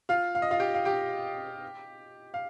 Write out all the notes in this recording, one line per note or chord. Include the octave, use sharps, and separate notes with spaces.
F4 F5
F5
D#5
F4 F5
G4 G5
F5
G4 G5
F5